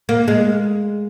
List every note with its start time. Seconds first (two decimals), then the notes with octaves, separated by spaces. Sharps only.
0.09 A#3
0.28 G#3